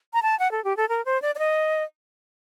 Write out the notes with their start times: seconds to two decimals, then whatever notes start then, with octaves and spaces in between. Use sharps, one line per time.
0.14 A#5
0.22 A5
0.39 F#5
0.52 A4
0.64 G4
0.77 A4
0.89 A#4
1.05 C5
1.22 D5
1.35 D5
1.39 D#5